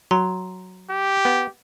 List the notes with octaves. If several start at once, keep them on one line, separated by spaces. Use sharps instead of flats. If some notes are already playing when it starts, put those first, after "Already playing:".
F#3 A#5 C6
G4
B3